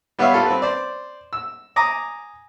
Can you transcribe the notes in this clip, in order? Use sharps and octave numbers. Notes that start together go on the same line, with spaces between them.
G3 B3 B4 C#5 E5 F5
G3 F4 A4
C4 B4
C5 D5
E6
G#5 A#5 D6 D#6